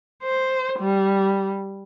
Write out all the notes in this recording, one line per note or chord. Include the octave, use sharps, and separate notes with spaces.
C5
G3